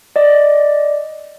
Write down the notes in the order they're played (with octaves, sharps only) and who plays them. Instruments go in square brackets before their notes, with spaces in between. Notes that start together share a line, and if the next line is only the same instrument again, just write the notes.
[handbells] D5 D#5